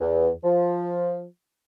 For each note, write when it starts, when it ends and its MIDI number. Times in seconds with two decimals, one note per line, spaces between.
0.01 0.30 40
0.44 1.24 53